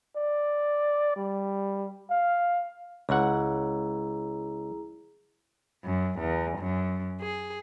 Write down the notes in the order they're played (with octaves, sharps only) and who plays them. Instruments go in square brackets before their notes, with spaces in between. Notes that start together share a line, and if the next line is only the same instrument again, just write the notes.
[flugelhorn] D5
G3
F5
[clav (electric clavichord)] C#2 F#5 [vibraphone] E4 G#4 A#5
[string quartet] F#2
E2
F#2
G#4